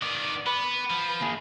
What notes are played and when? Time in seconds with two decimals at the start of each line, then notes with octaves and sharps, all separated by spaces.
0.02 D#3 B3 D5
0.46 B3 B4
0.91 F3
1.22 A#3 G#4